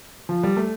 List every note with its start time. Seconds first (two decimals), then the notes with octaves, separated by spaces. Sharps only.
0.29 F3
0.43 G3
0.57 A3